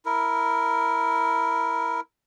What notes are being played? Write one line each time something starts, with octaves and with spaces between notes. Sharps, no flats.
E4 A#4